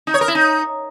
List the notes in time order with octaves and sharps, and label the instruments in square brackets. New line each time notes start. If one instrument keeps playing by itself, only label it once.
[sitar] D#4
C#5
A#4
E4
D#4